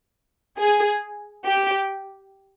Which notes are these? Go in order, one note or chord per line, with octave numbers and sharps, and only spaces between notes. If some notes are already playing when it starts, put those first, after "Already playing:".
G#4
G4